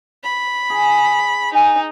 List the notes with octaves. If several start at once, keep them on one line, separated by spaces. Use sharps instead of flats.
B5
G#4
D#4 G#5